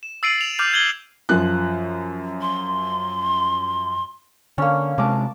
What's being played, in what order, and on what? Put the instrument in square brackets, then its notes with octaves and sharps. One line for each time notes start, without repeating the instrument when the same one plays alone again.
[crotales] E7
E6 A6 C7 D7 D#7 F#7
F7
D6 F6 G6 F7
G#6 F#7 G7
[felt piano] F#2 F3 F#6
[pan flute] C6
[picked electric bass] D3 [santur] A#3 C#4
[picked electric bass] C3 G#3 [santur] A5 D6